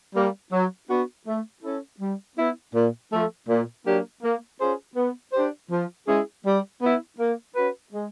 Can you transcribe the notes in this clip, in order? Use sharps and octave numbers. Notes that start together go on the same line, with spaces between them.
G3 A#3
F#3
B3 D4 F#4
A3
C#4 E4 A4
G3
B3 E4
A#2
F3 A3
A#2
F#3 A#3 D4 G4
A#3
C#4 F4 G#4 C5
B3
D4 G4 C5
F3
G#3 C#4 E4 G#4
G3
B3 E4
A#3
C#4 F#4 B4
G#3